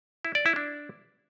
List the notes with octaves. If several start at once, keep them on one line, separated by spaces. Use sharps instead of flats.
E4
D5
E4
D4